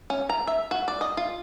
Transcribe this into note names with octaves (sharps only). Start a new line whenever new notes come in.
C#4
A#5
E5
F#4
D5
D#5
F4